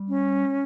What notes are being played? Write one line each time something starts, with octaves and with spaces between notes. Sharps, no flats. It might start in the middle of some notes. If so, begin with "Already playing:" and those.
Already playing: G3
C#4